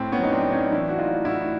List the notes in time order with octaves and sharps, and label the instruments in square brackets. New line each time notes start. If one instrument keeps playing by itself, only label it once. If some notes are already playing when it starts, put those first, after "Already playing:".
Already playing: [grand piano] A2 C4
B3 C#4
F#3 D#4
C4 D4
F#3
C#4 D#4
E3 D4 E4
F#4
A2 D#4 F4
A2 E4 F#4